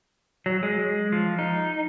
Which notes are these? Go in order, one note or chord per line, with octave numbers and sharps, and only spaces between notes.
F#3
G#3
F3
D#4